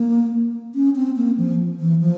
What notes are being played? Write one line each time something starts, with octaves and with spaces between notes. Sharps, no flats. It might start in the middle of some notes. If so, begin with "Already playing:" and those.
Already playing: A#3
C#4
C4
A#3
F3
E3
F3